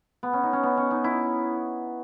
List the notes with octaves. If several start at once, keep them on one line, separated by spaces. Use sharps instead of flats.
B3
C#4
D#4
C#4
B3
C#4
D#4
E4